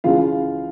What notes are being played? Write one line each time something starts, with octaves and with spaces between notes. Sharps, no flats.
C#2 C#3 E3 F4 F5